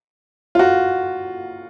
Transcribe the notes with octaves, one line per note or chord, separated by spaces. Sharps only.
F4
F#4